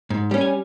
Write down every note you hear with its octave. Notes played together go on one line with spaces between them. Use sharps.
G#2
G3 C#4
G#5